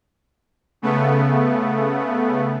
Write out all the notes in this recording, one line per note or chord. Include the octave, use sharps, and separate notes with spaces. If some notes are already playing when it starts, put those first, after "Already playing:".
C#3 A3 B3